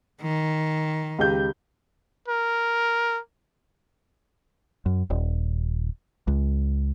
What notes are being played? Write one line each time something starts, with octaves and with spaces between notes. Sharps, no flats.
D#3
C#2 G4 G6
A#4
F#2
D#1
C#2